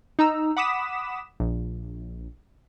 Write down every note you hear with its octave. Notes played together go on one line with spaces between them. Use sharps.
D#4 A#5 E6
F#5 B5 D6 D#6 B6 E7
A#1